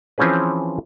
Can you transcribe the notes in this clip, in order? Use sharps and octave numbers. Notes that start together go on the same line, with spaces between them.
E3 F3 C4 C#4 G#4 B4